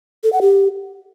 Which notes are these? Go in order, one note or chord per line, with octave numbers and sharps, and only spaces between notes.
A4
F#5
G4